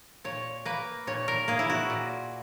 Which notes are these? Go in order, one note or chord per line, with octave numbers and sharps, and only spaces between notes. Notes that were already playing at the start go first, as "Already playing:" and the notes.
A#2 C#5
A#3 B4
A#2 C#5
A#4
A#3 G#4
E4
F#4
A#2